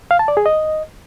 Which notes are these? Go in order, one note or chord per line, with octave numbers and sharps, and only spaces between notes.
F5
A5
D5
G#4
D#5